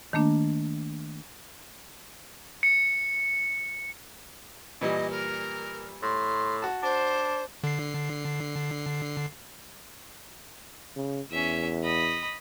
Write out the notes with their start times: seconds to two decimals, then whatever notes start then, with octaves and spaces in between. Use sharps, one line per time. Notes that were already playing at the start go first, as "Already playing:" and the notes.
0.13 D#3 A3 A#3 D4
2.63 C#7
4.81 A#2 E3 G3 D#5
5.10 A#4
6.02 A2 C6
6.62 F#4 A5
6.83 D4 C5
7.64 D3 C7
10.96 C#3
11.31 E2 C#4 E5
11.83 D#5 B5